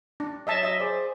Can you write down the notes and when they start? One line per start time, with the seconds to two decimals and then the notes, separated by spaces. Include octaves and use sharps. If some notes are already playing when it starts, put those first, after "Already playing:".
0.20 D4
0.47 F#3 D#5 E5 A5
0.63 D#5 E5
0.80 G#4 C5 D5